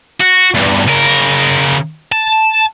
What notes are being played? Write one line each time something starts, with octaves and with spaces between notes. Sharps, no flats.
F#4
E2 G2
C#3 A#4
A5